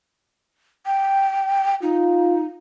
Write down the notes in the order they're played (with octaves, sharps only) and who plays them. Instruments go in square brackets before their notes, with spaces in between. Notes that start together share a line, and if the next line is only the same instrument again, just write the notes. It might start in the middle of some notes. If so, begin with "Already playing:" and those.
[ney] G5
[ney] D#4 [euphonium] F4